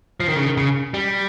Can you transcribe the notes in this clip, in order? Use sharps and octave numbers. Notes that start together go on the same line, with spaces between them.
F3
D#3
C#3
D#3
C#3
G3